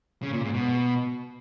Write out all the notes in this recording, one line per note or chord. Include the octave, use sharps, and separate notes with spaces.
C#3
A#2
G#2
B2